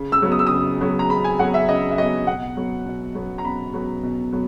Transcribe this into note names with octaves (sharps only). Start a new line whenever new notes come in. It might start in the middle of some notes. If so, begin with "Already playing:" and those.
Already playing: C#3
E6
F#3 B3
D#6
E6
C#3 D#6
F#3 B3
A#5
C#3 B5
G#5
F#3 B3 F#5
E5
C#3 D#5
E5
F#3 B3 D#5
B2 F#5
F#3 B3
B2
F#3 B3
A#5
B2 B5
F#3 B3
B2
F#3 B3